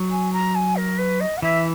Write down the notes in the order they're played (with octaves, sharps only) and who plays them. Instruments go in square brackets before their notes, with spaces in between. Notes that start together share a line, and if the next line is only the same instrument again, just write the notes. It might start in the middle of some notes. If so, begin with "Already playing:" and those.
Already playing: [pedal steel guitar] F#3
[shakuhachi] G#5
A#5
G#5
A#4
B4
D#5
F#5
[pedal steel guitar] E3 [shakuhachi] E5